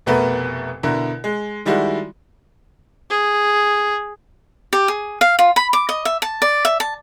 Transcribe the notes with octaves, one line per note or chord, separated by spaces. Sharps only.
F1 B2 A3 B3 A#4 B4
B2 D3 E4 A#4
G#3
D#3 G3 G#3 E4 F#4
G#4
G4
G#4
F5
F4
B5
D6
D#5
E5
A5
D5
E5
A5